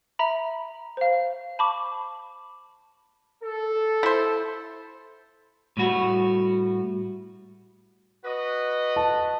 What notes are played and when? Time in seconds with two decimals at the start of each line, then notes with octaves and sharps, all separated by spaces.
0.19 E5 A#5 B5
0.97 C5 F5
1.59 A5 B5 C#6 D6
3.44 A4
4.03 E4 C5
5.77 A2 G3 F#4
8.25 F#4 B4 D#5
8.96 A5